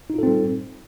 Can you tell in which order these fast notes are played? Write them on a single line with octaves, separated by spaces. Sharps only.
D#4 F4 A4 C4 G3